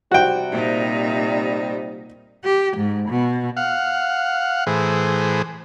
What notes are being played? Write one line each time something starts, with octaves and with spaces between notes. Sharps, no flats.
C3 G3 F#4 G5
A#2 D#4
G4
G#2
B2
F5 F#5
A2 E3 G#4 C5